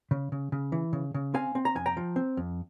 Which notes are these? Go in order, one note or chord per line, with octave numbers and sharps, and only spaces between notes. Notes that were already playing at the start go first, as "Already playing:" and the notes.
C#3
C#3
C#3
E3
C#3
C#3
C4 F5 G#5
C4
A#5
F2 G#5
G5 A#5
F3
C4
F2